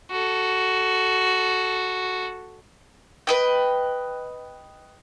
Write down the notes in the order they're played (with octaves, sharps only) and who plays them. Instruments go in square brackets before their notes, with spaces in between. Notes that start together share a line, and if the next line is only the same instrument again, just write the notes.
[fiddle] F#4 A4
[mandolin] B4 D#5 G5